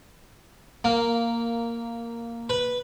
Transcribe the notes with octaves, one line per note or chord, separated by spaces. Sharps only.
A#3
B4